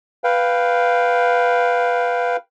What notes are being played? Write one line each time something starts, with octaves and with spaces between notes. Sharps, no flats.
B4 F5 G5